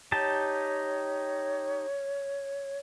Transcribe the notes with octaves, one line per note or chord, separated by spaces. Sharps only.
D#4 G4 C#5 A5